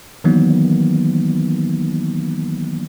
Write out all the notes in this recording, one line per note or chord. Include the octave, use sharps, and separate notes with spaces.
D#3 E3 F#3 A#3 B3 D#4